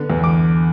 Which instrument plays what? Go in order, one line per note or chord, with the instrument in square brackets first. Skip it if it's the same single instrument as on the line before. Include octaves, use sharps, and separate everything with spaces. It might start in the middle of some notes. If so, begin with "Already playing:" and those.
Already playing: [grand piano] D3 B3
E2
D6